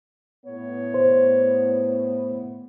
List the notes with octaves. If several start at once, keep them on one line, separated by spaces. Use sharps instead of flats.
A2 B3 C#5
C5